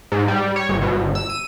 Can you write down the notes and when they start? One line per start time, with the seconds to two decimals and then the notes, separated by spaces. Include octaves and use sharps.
0.12 G#2
0.28 G3
0.56 C#5
0.69 G1
0.82 B2
0.95 G1
1.15 E6
1.30 D#7